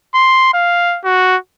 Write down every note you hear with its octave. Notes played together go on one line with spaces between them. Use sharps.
C6
F5
F#4